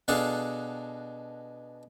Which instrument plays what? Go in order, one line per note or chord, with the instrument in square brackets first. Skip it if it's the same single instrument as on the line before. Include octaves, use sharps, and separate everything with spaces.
[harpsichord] B2 D4 G#4 A4 F5 F#5